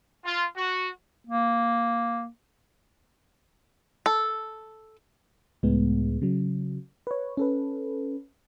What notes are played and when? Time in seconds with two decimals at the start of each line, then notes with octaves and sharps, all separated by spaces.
0.25 F4
0.57 F#4
1.27 A#3
4.06 A4
5.63 C#2 A2 G#3 B3
6.22 C#3 F#3
7.07 B4 C#5
7.37 C#4 A4 B4